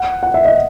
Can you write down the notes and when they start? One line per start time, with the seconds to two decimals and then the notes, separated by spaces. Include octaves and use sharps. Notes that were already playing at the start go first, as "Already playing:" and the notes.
Already playing: F#5
0.23 F#5
0.34 E5
0.45 D#5